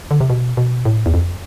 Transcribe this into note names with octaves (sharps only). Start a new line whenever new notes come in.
D3
C3
B2
B2
A2
E2
F2